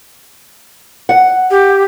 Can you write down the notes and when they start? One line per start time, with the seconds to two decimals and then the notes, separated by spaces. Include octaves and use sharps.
1.09 F#5
1.51 G4